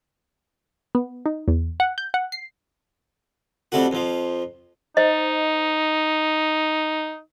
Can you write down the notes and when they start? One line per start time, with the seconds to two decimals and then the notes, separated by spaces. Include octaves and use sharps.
0.95 B3
1.26 D#4
1.48 E2
1.80 F#5
1.98 G6
2.14 F#5
2.32 C7
3.72 F2 G3 A3 F#4
3.91 F2 F3
4.97 D#4 C5 D#5